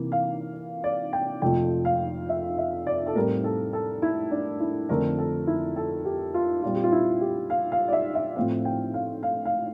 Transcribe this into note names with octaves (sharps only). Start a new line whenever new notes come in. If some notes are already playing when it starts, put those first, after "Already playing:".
Already playing: C3 E3 A#3
F5
D5
G5
F2 C3 F3 A3 G5
F5
E5
E5
D5
A4
A2 G3 C4 A#4
A4
A4
E4
D4
E4
F2 D3 A3 C4 A#4
A4
E4
A4
G4
F4
A#2 G3 C4 F4
G4
F4
E4
G4
F5
F5
D5
E5
E5
A2 F3 C4 F5
G5
F5
F5
F5